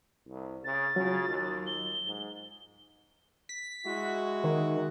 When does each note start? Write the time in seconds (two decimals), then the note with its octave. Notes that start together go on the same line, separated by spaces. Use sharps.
0.27 C2
0.64 C#3 A6
0.96 C#3 F#3 F4
1.29 D#2
1.67 G7
2.06 G#2
3.49 B6
3.86 G#3 E4 F#4
4.44 D#3